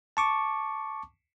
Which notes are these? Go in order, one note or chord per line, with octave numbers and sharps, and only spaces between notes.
A5 C#6 D6